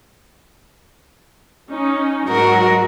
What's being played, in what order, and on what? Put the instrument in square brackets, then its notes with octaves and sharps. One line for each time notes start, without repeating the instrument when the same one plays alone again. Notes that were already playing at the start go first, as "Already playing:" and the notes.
[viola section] C#4 D#4
[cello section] G#2 G#3 F#4 [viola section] F#3 [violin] A#4